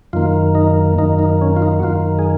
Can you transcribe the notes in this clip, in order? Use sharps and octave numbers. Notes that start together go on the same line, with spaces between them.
F#2 D#3 A#3 F4
D#4
F#2 D#3 A#3 D#4
D#4
C#4
F4
D#4
F#4
F#2 D#3 A#3 F4
G#4